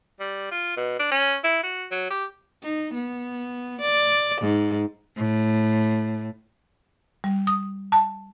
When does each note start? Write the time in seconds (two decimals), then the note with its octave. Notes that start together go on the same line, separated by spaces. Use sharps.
0.20 G3
0.51 F4
0.77 B2
0.99 D4
1.11 C#4
1.44 E4
1.63 F#4
1.91 F#3
2.10 G4
2.63 D#4
2.94 B3
3.81 D5
4.41 G#2
5.17 A2
7.24 G3
7.47 D#6
7.92 A5